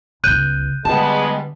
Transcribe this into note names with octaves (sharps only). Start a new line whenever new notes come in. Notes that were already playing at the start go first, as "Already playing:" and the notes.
G1 C#2 F#6 G6 D#7
D3 G3 G#3 B3 A5